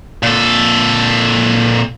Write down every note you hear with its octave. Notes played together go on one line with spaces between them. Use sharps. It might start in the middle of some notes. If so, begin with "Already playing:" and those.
A#2 A4